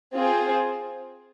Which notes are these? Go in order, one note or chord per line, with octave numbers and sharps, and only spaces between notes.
C4 F4 G#4 C5